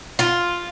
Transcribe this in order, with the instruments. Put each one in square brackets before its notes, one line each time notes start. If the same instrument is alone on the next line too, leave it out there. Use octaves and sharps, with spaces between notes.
[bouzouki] F4